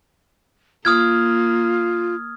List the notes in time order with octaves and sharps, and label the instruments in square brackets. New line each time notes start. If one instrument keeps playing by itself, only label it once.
[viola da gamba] A#3 [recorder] F4 [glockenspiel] D#6 F6 G#6